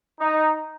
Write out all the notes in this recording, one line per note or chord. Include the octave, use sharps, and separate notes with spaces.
D#4